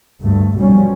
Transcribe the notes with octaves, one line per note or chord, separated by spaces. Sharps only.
D2 G2 A3
B1 B2 F3 G3 C#4